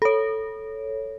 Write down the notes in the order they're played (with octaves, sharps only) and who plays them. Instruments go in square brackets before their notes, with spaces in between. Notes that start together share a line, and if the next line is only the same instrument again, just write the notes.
[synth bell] A4 C#5